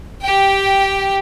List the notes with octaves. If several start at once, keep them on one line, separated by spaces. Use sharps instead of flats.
G4 G5